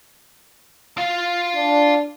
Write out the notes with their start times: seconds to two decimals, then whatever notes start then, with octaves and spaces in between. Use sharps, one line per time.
0.98 F4 F5
1.55 D4